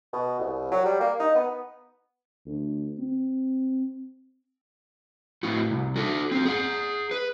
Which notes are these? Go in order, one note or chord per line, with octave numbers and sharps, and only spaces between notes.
B2
C2
F#3
G3
A#3
D#4
B3
D2
C4
A2 F#4
C2
F#4 A4
C4 A4
G#4 F#5
B4